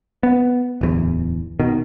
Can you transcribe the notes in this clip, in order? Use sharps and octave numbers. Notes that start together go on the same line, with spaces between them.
B3
D1 E2
B2 D#3